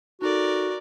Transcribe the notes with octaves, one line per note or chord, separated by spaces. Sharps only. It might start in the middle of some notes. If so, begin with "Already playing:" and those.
D#4 F#4 A4 A#4 D5